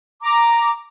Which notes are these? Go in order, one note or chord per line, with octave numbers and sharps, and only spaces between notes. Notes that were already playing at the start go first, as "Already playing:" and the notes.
A#5 D6